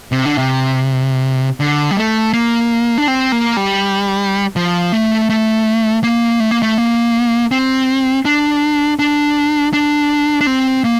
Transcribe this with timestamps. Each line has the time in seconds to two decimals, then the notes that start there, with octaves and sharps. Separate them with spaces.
0.12 C3
0.25 D3
0.38 C3
1.60 D3
1.91 G3
1.97 A3
2.33 A#3
2.98 D4
3.08 C4
3.32 A#3
3.57 G3
4.56 F3
4.92 A3
5.30 A3
6.03 A#3
6.40 A3
6.51 A#3
6.62 A3
6.78 A#3
7.51 C4
8.25 D4
8.99 D4
9.73 D4
10.41 D4
10.47 C4
10.84 A#3